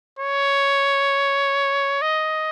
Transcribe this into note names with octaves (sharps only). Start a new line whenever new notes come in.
C#5
D#5